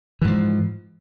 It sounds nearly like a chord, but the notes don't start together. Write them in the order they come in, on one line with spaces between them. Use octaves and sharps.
E3 G#2 F3